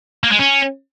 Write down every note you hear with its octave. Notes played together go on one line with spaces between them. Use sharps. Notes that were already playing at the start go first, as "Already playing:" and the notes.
A#3
G#3
C#4